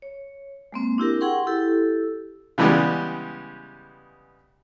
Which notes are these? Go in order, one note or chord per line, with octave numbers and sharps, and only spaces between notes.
C#5
G#3 A#3 C4
D4 E4 G4 A#4
G#4 F#5 G5 C6 C#6
E4 G4 A4
C#3 E3 G3 G#3 B3 G4